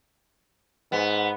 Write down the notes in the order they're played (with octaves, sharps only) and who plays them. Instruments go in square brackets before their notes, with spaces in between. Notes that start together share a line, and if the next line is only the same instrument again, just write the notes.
[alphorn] G#2 [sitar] B3